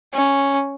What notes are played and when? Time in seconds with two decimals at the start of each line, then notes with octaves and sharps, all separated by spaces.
0.13 C#4